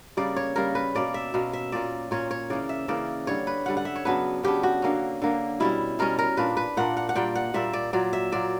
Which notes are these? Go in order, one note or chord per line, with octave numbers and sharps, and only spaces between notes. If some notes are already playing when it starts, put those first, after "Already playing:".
C#3 G3 A#3 D5
C#5
C#3 G3 A#3 A#4
B4
B2 A#3 C#4 D5
E5
B2 A#3 C#4
E5
A#2 A#3 C#4 D5
A#2 A#3 C#4 C#5
C#5
C#3 E3 A#3 C#4 D5
E5
C#3 E3 A#3 C#4 D5
D3 G3 C#4 C#5
B4
D3 G3 C#4 F#5
F#5
E5
C#5
C#3 F#3 B3 D4 B4
C#3 F#3 B3 D4 G4
F#4
D3 A#3 C#4
D3 A#3 C#4
B2 G3 C#4 E4
B2 G3 C#4 A#4
A#4
A#2 A#3 D4 B4
B4
A#2 A#3 D4 F#5
F#5
F#5
A#2 G3 A#3 G5
F#5
A#2 G3 A#3 E5
D5
A#2 F#3 A#3 D5
E5
A#2 F#3 A#3 D5